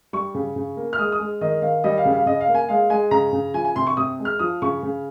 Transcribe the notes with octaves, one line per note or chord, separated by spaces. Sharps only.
G3 C#6
C#3
C#3
A#3
F6
G#3 D#6
D#6
G#3
D#3 D#5
D#3 F5
G3 D#5
F5
C#3
F5
C#3 D#5
F5
A#3
G#5
G#3 F5
G#3 G#5
C#3 A#5
C#3
F3 G#5
G#5
C3 C6
C#6
C3 D#6
G#3
F6
F3 D#6
C#3 C#6
C#3